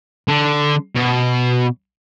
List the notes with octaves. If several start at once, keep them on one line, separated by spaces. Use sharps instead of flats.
D3
B2